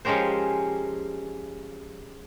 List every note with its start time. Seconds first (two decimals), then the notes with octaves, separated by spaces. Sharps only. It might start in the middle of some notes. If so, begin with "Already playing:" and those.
0.05 F3 G#3 C#4 G4 A#4 C5